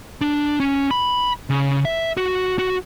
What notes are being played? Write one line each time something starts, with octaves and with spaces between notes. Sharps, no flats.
D4
C#4
B5
C#3
E5
F#4
F#4